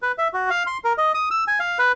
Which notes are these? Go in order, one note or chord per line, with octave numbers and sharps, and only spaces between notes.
B4
E5
F#4
F5
C6
A#4
D#5
D#6
E6
G#5
F5
B4